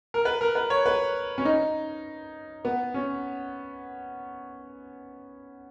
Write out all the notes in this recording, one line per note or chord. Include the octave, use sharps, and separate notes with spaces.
A#4
B4
A#4
B4
C#5
B4
C#4
D#4
B3
C#4